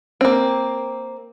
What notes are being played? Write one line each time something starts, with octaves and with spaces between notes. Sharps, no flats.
A#3 C4